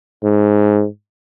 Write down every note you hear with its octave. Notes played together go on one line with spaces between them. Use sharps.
G#2